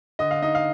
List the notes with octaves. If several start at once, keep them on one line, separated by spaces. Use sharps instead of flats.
D3 D#5
F5
D#4 D#5
F5